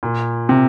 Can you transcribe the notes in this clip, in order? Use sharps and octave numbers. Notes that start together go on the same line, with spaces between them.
A#2
C3